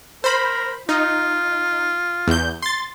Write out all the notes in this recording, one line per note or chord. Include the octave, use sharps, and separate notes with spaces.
A#4 C5 B5
D#4 F4
E2 G6
C6 A6